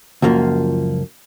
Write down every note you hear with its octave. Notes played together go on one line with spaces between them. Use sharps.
C#2 F#2 F3 A#3